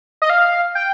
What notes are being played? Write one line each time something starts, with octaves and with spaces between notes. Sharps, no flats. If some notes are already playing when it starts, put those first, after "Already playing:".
D#5
F5
G5